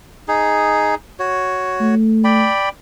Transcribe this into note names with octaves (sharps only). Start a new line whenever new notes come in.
D#4 G#4
F#4 C#5
A3
D5 G5 B5